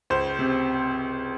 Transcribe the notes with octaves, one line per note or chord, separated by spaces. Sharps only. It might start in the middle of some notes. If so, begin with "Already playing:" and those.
C#2 C5
C3